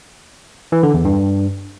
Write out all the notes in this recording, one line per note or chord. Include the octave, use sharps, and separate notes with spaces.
E3
D3
E2
G2